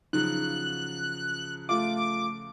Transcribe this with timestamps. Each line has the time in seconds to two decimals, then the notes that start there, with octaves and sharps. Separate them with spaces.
0.13 C#3 F3 F#3 D#4 F#6
1.69 A3 F4 D6